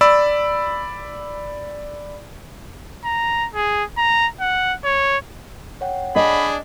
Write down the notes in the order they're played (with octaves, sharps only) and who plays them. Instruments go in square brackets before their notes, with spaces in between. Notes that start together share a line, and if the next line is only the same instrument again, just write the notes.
[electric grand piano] D5 B5 E6
[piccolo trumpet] A#5
G#4
A#5
F#5
C#5
[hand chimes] C#5 F#5 G5
[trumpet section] D4 G#4 [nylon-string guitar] D5 D#5 [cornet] B5